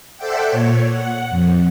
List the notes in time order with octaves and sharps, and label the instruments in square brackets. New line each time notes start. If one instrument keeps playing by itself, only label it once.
[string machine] A4 C5 D5 E5 F#5 G5
A#2 C#5
F#5
F2